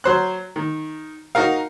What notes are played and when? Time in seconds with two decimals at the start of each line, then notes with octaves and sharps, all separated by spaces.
0.04 F#3 C5 F#6
0.56 D#3
1.35 D#4 F#4 A#4 F5